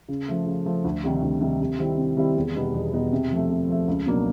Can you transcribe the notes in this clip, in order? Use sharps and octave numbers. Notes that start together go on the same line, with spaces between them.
C#3
F3 A3
C#3
F3 A3
D2
C3 D#3 G3
D2
C3 D#3 G3
C3
D#3 G3 C4 E4
C3
D#3 G3 C4 E4
E2
B2 G3 B3 D#4
E2
B2 G3 B3 D#4
C3
F3 A3
C3
F3 A3
C#2
B2 F#3 A#3 D4